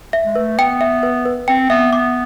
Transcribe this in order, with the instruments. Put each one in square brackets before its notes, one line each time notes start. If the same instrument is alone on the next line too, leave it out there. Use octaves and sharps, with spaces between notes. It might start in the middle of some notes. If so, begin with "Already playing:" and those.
[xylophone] E5
[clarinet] G#3
[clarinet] A3 [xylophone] B4
[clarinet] B3 [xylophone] G5
[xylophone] E5
B4
B4
[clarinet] C4 [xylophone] G5
[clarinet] B3 [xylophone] E5
[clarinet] B3 [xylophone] D6